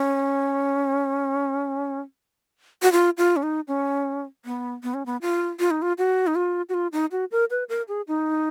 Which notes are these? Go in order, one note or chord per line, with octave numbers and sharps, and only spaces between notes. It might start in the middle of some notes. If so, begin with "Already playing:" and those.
Already playing: C#4
F#4
F4
F4
C#4
D#4
C#4
B3
B3
C#4
B3
F4
F4
D#4
F4
F#4
D#4
F4
F#4
F4
D#4
F#4
A#4
B4
A#4
G#4
D#4